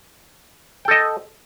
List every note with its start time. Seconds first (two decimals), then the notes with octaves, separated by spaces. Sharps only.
0.85 G5
0.88 A4
0.91 D#5